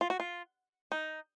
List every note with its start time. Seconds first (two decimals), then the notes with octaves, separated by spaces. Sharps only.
0.01 F4
0.10 F#4
0.20 F4
0.92 D#4